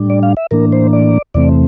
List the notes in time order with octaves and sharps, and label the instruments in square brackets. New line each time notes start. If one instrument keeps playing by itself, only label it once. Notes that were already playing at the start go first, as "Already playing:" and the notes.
Already playing: [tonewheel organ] A2 G3 D4
D5
F5
E5
A2 E3 A#3 D4 A#4
C5
D5
E2 C3 E3 A3 C4 D5